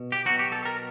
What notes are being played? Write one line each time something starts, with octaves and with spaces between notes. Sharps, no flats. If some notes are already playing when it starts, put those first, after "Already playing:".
Already playing: B2
G4
B2 F#3 F#4
G4
A4
A#4